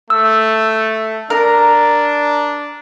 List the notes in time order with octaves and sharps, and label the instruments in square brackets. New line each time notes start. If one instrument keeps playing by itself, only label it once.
[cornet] A3 [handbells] E6
[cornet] D4 [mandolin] A#4